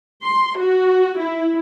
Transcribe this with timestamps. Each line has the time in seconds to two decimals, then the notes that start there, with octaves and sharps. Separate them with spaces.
0.23 C6
0.57 F#4
1.18 E4